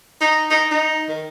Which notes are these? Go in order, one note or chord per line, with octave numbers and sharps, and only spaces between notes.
D#4
D#4
D#4
D#3